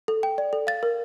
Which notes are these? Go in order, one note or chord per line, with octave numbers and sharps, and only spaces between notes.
A4
G5
D5
A4
F5 A6
A#4